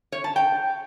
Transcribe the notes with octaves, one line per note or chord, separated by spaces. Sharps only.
C#5
A5
G5